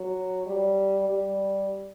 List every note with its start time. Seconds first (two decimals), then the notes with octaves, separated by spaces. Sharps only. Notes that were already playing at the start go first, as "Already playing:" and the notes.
Already playing: F#3
0.46 G3
1.08 G3